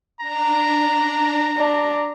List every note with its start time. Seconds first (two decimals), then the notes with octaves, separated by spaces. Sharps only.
0.20 D4 A#5
1.57 D4